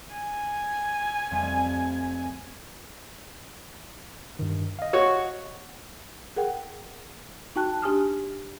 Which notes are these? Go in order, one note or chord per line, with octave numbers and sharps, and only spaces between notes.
G#5
F2 G3 A3
G2 D#3
D#5 F5
F#4 C#5
G#4 A#4 F#5 G5
D#4 F#4 G5 A5 F#6
D4 G4 G#5 D#6 F6